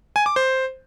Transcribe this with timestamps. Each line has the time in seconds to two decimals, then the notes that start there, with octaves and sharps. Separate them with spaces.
0.16 G#5
0.26 D6
0.36 C5